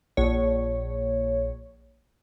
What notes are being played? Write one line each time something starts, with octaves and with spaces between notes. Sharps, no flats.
A#1 C#5